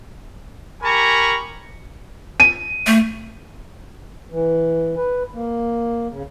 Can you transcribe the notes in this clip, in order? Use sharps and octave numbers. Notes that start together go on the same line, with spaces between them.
G4 A#4 G#5 A#5 B5 C#6
D#7
A3
E3
B4
A#3
C#3